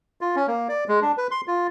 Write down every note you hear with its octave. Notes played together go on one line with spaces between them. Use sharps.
F4
C#4
A#3
D5
G#3
D4
B4
C6
F4